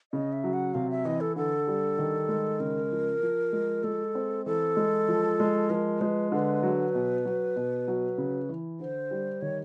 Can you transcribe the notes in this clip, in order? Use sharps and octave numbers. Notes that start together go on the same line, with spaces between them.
C#3 D#5
E5
F#3
F#5
C3 F5
E5
E3 D#5
A4
D3 A4
G3
D#3
G#3
C#3 A#4
F3
F3
G#3
G#3 A4
C4
E3 A4
G#3
F3
G#3
F3 A#4 B4
G#3 B4 C5
D3 B4
F#3
B2
F#3
B2
F#3
C#3
E3
D3 C5
G3
D#3 C#5